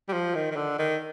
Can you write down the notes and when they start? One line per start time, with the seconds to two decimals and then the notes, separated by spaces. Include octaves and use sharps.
0.09 G3
0.13 F3
0.35 D#3
0.51 D#3
0.56 D3
0.79 D#3